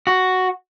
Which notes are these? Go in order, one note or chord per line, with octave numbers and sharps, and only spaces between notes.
F#4